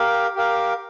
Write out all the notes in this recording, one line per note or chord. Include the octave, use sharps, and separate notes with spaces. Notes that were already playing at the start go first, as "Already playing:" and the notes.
Already playing: G4 A#4 F5
G4 A#4 F5